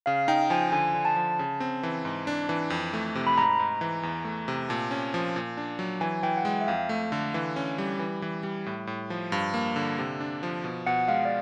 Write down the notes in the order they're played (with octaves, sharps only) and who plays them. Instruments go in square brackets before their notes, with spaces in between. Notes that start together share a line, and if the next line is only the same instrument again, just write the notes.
[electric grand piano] C#3 [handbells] F5
[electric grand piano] D#4 [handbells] G5
[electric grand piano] F3 [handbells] G#5
[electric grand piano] D3 [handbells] G#5
[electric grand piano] D3
[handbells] A5
[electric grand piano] F3
C#3
C4
E3
G#2
D4
E3
F2
A3
C3
[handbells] B5
[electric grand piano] G#2 [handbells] A#5
[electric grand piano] G#2
E3
E2
A3
C3
[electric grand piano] A#2 [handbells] A5
[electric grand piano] C#4
F3
A#2
D4
F#3
[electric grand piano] E3 [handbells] G#5
[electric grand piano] E3 [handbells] G5
[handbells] F#5
[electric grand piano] G#3 [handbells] G5
[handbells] E5
[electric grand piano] F2 [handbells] F5
[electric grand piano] A3
D3
E3
C#4
G3
E3
E3
G3
A2
A2
F3
[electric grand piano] G2 [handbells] F5
[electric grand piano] A#3
D3
C3
D4
F3
B2
[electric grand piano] B2 [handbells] F#5
[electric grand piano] G#3 [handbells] F5
[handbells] D5